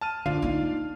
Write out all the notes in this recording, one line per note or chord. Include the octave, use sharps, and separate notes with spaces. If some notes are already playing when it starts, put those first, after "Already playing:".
A5 F6 D#7
D2 D4 F4 F5
A#3 D#4